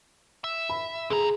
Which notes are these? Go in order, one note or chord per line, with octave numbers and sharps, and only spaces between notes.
E5
B5
D3 G#4 A#5